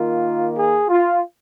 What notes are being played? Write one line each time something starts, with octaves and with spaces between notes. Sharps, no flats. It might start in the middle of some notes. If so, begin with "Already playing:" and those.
Already playing: D#3 A#3 F4
G#4
F4